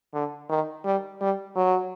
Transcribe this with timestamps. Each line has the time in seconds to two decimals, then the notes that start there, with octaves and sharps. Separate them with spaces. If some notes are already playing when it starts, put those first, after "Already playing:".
0.14 D3
0.49 D#3
0.85 G3
1.21 G3
1.56 F#3